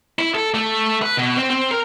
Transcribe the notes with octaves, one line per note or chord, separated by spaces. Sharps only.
E4
A4
A3
B4
B2
C4
C4
A#4